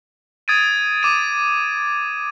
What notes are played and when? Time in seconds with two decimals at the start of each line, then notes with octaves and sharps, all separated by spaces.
0.48 D#6 G#6 A6 D7 D#7
1.03 D6 D#7